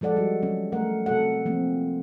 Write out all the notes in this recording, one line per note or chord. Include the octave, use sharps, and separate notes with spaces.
F3 G#3 A4 D5 F#5
G3 F#4
F#3 G3 C#4
A3 A#4 F#5
C3 A4 F#5
F3 A#3 C4